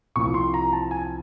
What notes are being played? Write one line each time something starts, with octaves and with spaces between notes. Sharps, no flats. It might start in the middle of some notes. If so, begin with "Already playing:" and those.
C2 C3 F3 C#6
C6
A#5
A5
G#5